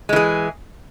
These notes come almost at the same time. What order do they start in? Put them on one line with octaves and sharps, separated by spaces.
G#3 E3 G#4